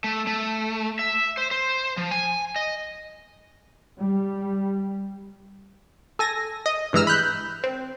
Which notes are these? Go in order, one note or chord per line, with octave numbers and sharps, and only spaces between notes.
A3
A3
E5
C5
C5
F3
G#5
D#5
G3
A4 G#5 A#6
D#5
G2 E3 G#3 A#5 E6 F6
B5 F#6 G6
C4